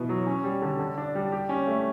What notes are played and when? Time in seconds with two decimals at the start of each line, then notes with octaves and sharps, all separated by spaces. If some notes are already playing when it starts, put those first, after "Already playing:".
Already playing: B2 E3 B3
0.09 F#3
0.27 C#4
0.44 G3
0.62 D3
0.79 D3
0.98 D4
1.15 G3
1.32 G4
1.49 C#4
1.67 A3